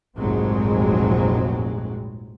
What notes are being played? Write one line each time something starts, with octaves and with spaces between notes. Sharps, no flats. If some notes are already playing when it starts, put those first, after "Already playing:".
F1 A#1 G#2 F#3 G#3 C4